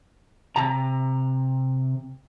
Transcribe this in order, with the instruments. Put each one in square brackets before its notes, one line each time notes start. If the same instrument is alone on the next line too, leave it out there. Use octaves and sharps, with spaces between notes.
[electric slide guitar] C3 A#5